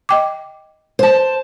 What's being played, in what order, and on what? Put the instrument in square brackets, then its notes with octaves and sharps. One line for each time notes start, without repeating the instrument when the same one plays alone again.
[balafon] D#5 G5 D6
[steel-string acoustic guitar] C5 A5